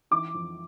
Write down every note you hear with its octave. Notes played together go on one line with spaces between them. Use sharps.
E3 D6
F2